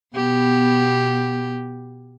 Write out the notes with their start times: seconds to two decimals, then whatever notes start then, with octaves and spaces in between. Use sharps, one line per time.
0.16 B2 B3 G4